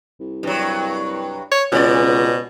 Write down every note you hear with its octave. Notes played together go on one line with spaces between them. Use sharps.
C2
G2 F#3
C#5
C#2 B2 C4 D5